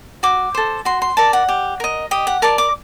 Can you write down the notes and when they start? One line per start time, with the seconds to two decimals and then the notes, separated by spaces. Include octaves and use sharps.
0.23 F#4 D6
0.54 A4 C5
0.85 F#4 C6
1.02 C6
1.17 A#4 D5 A5
1.33 F#5
1.49 G4
1.80 A#4 D#5
2.11 G4 D#5
2.27 F#5
2.42 A#4 D5 A5
2.58 D6